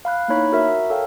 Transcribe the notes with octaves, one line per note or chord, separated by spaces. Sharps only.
F5 B5 F#6
A#3 B3 D#4 E4 C#5 B5
F#4 A#4 E5
A4 A#4 C#5 F5 G5